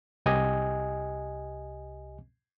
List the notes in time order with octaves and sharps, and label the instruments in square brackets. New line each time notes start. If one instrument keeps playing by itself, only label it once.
[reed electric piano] C2 G4 D#5 G#5